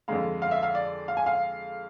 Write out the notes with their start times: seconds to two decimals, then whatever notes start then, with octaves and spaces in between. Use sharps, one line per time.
0.08 F2 D3 G#3 F5
0.42 F5
0.51 E5
0.63 F5
0.75 D5
1.08 F5
1.17 G#5
1.26 F5